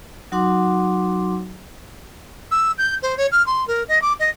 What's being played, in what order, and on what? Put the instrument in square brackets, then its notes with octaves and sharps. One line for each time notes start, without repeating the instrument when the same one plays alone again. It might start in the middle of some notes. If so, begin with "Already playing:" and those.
[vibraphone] F#3 D#4 F#4 F#5 C6 D6
[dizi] E6
G6
C5
C#5
F6
C6
A#4
D#5
D6
D#5